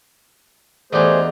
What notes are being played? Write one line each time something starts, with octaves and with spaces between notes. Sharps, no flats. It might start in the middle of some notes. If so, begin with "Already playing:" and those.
E2 D#3 A3 D4 D#4 G4 G#4 C5